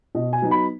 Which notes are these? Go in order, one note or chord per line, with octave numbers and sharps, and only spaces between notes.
B2 D#5
G#5
F#3 B3 D#4
B5